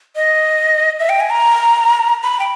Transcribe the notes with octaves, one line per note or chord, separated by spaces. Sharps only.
D#5
E5
G5
G#5
A#5
B5
G5